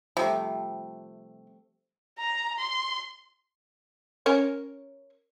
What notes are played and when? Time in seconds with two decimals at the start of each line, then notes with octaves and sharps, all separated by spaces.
0.17 C3 F3 G3 A3
2.19 A#5
2.59 C6
4.26 C#4 A#4 C#5